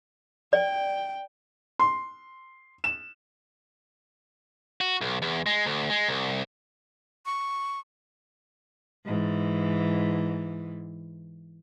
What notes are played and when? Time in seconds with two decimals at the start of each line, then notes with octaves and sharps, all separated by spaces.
0.53 D5 G5
1.79 C6
2.84 E7
4.81 F#4
5.01 B1
5.22 E2
5.46 G#3
5.66 D2
5.90 G#3
6.08 C2
7.26 C#6
9.05 G#2 E3